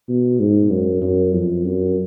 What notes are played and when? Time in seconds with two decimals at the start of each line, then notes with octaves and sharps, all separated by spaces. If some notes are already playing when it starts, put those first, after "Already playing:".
0.09 B2
0.40 G#2
0.71 F#2
1.02 F#2
1.33 F2
1.64 F#2